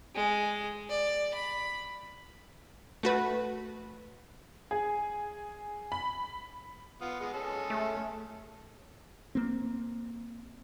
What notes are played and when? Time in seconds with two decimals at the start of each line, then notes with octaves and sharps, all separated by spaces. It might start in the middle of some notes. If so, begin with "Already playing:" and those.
0.15 G#3
0.89 D5
1.34 B5
3.03 A3 F#4 B4
4.71 G#4
5.92 B5
7.01 B3 F4
7.20 G#3 B3
7.34 G#3 C#4 A4
7.70 A3
9.35 A#3 C4